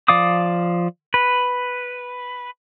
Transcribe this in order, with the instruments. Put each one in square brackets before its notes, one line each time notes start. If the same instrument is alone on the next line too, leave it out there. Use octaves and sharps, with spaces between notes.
[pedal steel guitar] F3 D5 F5 D6 D#6
B4